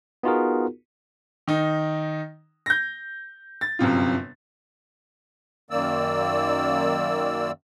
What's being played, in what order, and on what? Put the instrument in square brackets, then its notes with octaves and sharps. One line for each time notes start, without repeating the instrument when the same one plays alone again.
[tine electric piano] B3 D#4 F4 F#4 G#4 A#4
[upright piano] D#3 D#4
G6 A#6
A6
G1 F#2 C3 F4
[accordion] F#2 D#3 A#3 D5 E6